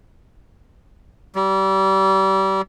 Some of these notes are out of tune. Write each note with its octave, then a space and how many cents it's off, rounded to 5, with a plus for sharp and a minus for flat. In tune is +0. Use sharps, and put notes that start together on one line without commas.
G3 -30